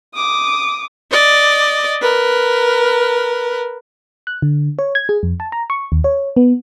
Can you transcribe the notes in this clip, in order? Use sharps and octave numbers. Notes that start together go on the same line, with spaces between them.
D6 D#6
D5 D#5
A#4 B4
F#6
D3
C#5
G#6
G#4
F2
A5
A#5
C#6
D#2
C#5
B3